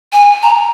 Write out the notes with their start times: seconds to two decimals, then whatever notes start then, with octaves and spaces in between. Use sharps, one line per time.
0.13 G#5
0.43 A#5